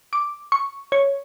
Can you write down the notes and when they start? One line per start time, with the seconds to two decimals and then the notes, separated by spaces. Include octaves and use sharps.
0.13 D6
0.52 C#6
0.92 C#5